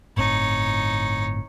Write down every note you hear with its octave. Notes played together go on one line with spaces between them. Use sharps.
G1 A2 C4 D#4 C#5